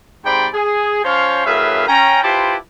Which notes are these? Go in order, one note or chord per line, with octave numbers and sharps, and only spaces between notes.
G#2 C3 C5 D5 G5 B5
G#4
F3 C#4 C5 C#5 F5
F#2 A2 C#3 B4 E5 F5
C#4 G5 A#5
E4 F4 G4 B4 C5 A5